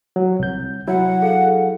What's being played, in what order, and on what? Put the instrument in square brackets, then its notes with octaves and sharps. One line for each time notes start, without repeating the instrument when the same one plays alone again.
[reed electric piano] F#3
C2 G6
[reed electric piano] F#3 E4 [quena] F#5
[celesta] G#4 A4 F5